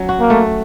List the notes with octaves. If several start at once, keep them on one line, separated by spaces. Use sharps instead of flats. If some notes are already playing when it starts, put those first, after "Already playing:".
Already playing: F#3 C#4
F#4
A#3
A3